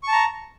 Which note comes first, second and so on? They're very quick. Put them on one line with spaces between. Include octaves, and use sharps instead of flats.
C#6 A5 A#5